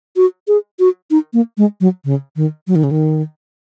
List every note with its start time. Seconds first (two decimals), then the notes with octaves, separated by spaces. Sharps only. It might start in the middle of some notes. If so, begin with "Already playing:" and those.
0.16 F#4
0.48 G#4
0.79 F#4
1.11 D#4
1.33 A#3
1.58 G#3
1.81 F#3
2.05 C#3
2.36 D#3
2.67 F#3
2.76 D#3
2.84 C#3
2.91 D#3